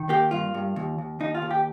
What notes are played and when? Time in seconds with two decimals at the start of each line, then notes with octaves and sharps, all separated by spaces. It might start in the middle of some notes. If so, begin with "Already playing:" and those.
Already playing: D#3
0.09 A#3 G4
0.31 G2 F4
0.54 G2
0.76 D#2
0.98 D#2
1.20 D#2 D#4
1.35 F4
1.42 D#2
1.51 G4